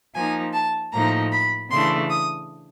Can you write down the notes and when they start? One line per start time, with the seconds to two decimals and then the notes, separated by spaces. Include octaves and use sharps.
0.15 F3 A#3 D#4 G#5
0.54 A5
0.92 A2 F3 A#3 D#4 A#5
1.32 B5
1.71 C#3 E3 A3 D4 C6
2.10 D#6